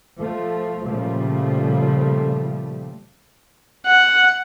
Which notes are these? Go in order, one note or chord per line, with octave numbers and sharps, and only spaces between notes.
F3 A3
A#2 C#3 F3 G3 A3
F#5